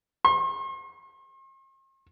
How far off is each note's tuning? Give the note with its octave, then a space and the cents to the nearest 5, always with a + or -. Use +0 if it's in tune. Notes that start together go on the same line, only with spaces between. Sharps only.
C6 +45